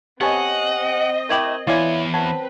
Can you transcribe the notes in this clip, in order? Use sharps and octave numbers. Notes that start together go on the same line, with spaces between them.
B3 C4 G4 A4 C#5 D#5 F#5 G#5
A3 E4 G4 A#4 G#6 F#7
E3 B3 E4 F4 C#5 D5 E5 G#5
F#3 C4 B4 A5